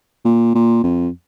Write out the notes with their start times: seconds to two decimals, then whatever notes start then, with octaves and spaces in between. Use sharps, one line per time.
0.25 A#2
0.55 A#2
0.83 F2